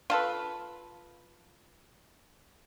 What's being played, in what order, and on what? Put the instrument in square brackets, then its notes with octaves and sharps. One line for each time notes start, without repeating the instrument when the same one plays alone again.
[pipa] F4 A4 B4